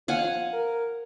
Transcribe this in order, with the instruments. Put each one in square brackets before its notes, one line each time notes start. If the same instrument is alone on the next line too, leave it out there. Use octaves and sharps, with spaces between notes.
[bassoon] F3 [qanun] F5 F#5 G#5
[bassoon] A#4